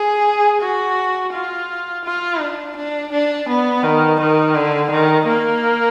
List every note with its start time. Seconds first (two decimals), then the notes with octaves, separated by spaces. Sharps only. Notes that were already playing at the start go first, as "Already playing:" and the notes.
Already playing: G#4
0.62 F#4
1.33 F4
2.05 F4
2.40 D4
2.76 D4
3.12 D4
3.48 B3
3.83 D#3
4.20 D#3
4.55 D3
4.91 D#3
5.27 A#3